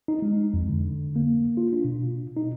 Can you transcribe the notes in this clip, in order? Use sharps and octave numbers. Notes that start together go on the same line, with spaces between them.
D#4
G#3
F2
D3
A#3
F4
D4
B2
D#4